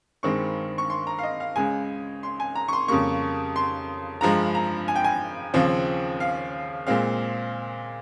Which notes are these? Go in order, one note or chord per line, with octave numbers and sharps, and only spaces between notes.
G2 D#3 G#3 C4 C#6
C#6
C6
A#5
F5
D#5
F5
C#2 C#3 G#3 G#5
C6
G#5
A#5
C#6
C6
F2 C#3 G3 A#3 C#6
C6
G2 F3 G#3 A#5
A#5
G#5
G5
G#5
D#2 C#3 F3 C4
F5
A#2 G#3 C4 F5